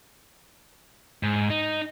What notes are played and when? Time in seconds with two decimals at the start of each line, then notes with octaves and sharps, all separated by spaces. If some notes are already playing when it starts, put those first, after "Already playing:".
1.23 G#2
1.50 D#4